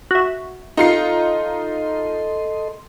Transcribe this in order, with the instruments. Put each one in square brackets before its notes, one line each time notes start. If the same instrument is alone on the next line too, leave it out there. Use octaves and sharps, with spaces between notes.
[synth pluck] F#4 E5
[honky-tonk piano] D#4 F4 C7 [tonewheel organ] A4 D#5 C6